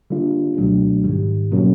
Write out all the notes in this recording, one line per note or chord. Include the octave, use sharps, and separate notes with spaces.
D3 G3 A#3 D4 F4
C#2 B2 F#3 A3 D4
G#2 D#3 G3
B2 F#3 A#3 C#4